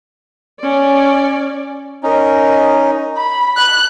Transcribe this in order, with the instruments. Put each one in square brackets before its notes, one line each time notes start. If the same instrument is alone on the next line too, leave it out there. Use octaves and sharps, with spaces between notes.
[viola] C#4 D5
[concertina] C#4 D#4 [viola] A#4
[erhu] B5
F#6